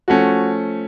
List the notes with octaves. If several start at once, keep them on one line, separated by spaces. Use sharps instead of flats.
F3 A3 C#4 F#4